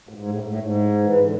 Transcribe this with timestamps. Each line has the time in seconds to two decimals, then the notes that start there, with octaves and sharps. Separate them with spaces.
0.09 A2
0.15 G#2
0.29 A2
0.44 A2
0.59 G#2
1.04 E3
1.19 D3